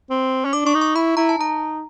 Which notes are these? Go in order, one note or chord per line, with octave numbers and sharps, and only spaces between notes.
C4
C#4
D4 D6
D4 C#6
D#4
C#6
E4 B5
E4 A#5
A5
D#4 A#5